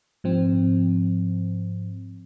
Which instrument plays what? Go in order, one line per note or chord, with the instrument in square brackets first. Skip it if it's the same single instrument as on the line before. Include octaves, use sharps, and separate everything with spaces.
[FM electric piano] G#2 F3 C4